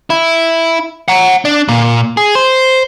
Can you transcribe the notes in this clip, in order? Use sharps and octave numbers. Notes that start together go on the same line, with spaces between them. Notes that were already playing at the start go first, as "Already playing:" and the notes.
E4
F#5 A#5
D4
A#2
G#4
C5